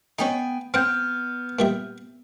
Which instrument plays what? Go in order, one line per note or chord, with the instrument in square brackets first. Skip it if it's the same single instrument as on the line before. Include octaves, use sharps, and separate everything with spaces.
[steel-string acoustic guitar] B3 G5 G#5 [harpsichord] C#4 D#4
[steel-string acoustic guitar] B3 [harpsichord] C4 F#5 [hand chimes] F6 G6
[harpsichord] A#2 G3 E5